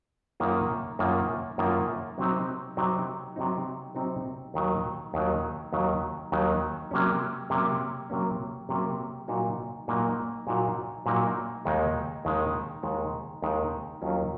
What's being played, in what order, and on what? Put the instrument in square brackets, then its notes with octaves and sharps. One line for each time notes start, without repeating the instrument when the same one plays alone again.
[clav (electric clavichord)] F#2 D#3 A#3 F4
F#2 D#3 A#3 F4
F#2 D#3 A#3 F4
C3 F#3 C4 D#4
C3 F#3 C4 D#4
C3 F#3 C4 D#4
C3 F#3 C4 D#4
D#2 D#3 F#3
D#2 D#3 F#3
D#2 D#3 F#3
D#2 D#3 F#3
C3 F#3 A#3 C#4
C3 F#3 A#3 C#4
C3 F#3 A#3 C#4
C3 F#3 A#3 C#4
A#2 F#3 A#3 D#4 F#4
A#2 F#3 A#3 D#4 F#4
A#2 F#3 A#3 D#4 F#4
A#2 F#3 A#3 D#4 F#4
D#2 D#3 G#3 D#4
D#2 D#3 G#3 D#4
D#2 D#3 G#3 D#4
D#2 D#3 G#3 D#4
D#2 D#3 F#3 C#4 F4